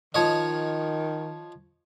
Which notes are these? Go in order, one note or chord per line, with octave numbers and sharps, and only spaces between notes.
D#3 F3 C#5 D#5